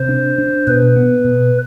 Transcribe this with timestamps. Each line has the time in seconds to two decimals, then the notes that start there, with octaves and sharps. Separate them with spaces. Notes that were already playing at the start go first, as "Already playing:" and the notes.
Already playing: C3 C5
0.09 D4
0.38 D4
0.67 B2 B4
0.96 B3
1.25 B2